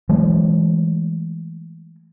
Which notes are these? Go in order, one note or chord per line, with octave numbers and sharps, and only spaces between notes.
E3 F#3 G#3 A3